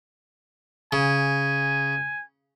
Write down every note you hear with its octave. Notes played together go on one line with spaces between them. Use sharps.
C#3 G#5